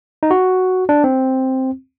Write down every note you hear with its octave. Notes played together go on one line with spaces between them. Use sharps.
D#4
F#4
D4
C4